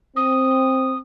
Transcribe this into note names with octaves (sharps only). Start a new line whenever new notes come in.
C4 D#6